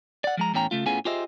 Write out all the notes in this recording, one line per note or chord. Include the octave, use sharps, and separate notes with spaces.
D5 F#5
F3 G#3 A#5
E2 A2 C#4 G5 A#5
C#3 A3 F4
A2 B3 C#4 F4 G#4 G#5
F4 G4 G#4 C5 D#5 E5